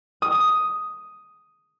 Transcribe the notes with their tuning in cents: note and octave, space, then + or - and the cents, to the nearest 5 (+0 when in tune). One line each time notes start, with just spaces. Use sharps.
D#6 +5